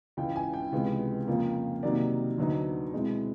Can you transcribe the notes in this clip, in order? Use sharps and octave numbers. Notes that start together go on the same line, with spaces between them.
C#2 C#3 E3 G5
G#5
G5
C#2 C3 E3 G#3 B3
F2 C#3 F3 A#3
C3 D#3 F#3 A#3 D5
D2 D3 F#3 B3 D#4
B2 G#3 C4 E4